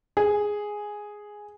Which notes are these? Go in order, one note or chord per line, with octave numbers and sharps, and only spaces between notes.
G#4